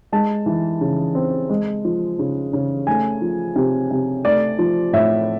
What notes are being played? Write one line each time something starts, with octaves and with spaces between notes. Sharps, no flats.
G#3 A5
E3
C#3
C4
G#3
F3
C#3
C#3
A3 G#5
F3
C3
C3
A3 D5
F3
A2 E5